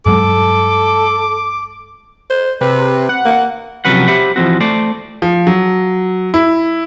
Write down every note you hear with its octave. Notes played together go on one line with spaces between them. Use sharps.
G2 F#3 G#3 A4 D6
C5
C3 B4
F#5
A#3
C3 F3 F#3 C#4 B4 F#5
G4 C5 E5 F#5 B5
E3 F3 G3 C4 F#4
A3 C5 D5
F3
F#3
E4